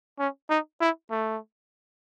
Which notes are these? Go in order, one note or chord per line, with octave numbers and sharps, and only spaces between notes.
C#4
D#4
E4
A3